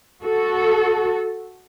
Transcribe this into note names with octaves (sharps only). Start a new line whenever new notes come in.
F#4 A4